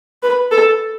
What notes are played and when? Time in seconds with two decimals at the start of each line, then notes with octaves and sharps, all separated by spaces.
0.23 B4
0.51 A4